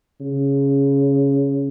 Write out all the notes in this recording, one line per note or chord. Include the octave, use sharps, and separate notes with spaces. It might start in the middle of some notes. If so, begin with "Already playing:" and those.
C#3